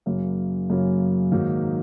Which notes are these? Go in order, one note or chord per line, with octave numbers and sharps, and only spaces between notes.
F#2 C#3 F#3 A#3
F#2 C#3 F#3 A#3
G#2 D#3 F#3 A#3 D#4